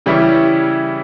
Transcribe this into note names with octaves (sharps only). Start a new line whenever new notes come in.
C#3 E3 G3 C#4 E4